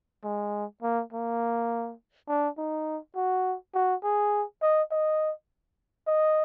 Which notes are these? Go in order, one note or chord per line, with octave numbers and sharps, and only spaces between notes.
G#3
A#3
A#3
D4
D#4
F#4
F#4
G#4
D#5
D#5
D#5